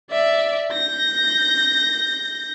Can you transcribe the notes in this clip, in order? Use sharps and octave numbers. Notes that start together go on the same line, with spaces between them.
D5 E5
G6 A#6